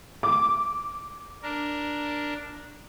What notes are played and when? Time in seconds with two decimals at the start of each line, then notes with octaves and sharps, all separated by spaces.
0.23 D6
1.43 D4 A#4